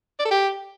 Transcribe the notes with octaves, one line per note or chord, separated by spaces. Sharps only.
D5
A4
G4